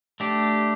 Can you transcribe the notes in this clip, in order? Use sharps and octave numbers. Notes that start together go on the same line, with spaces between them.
A3 D4 G4